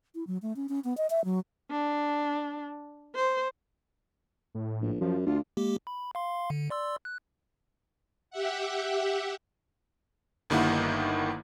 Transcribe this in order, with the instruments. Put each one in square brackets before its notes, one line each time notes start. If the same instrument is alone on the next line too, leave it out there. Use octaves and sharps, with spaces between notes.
[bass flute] E4
F#3
A3
C#4
C#4
B3
D#5
E5
F#3
[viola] D4
C5
[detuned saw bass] A2
[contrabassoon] A#1
[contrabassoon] F#2 [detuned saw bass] F3
[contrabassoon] D2 [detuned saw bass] F4
[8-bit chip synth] G#3 A#3 G4
B5
F5 C6
D3
D5 C6 E6
F#6
[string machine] G4 E5 F#5
[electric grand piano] G1 G2 D#3 A#3 E4 F#5